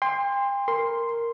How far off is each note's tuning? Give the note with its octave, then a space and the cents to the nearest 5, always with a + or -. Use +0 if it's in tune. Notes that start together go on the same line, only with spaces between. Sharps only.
G5 +40 C6 +0
A#4 +0 C6 +0